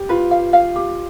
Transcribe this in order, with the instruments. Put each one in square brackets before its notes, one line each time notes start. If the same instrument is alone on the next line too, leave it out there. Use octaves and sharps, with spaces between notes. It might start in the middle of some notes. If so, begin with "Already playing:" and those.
Already playing: [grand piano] G4
[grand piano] F4 [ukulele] B4
[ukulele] F5
F5
G4